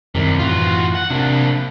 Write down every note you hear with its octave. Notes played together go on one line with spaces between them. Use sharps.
C2 F#2 C3 D#3 G3
F#2 A2 E3 F4 F#4
F#5
C3 A#3 D4